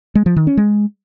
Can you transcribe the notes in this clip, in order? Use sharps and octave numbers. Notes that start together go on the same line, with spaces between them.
G#3
F3
D#3
C#4
G#3